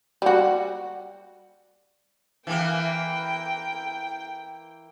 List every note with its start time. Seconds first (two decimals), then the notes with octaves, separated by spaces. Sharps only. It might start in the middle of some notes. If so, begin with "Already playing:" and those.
0.22 G3 F#4
2.47 E3 A#3 G5